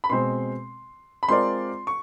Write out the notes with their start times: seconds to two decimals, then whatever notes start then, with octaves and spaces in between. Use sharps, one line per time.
0.04 B5
0.10 B2 G#3 C4 C6
1.23 B5
1.28 G#3 C4 F4 A#4 D5 C6
1.87 C#6